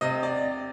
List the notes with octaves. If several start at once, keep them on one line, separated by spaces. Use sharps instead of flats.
C3 D#5
D5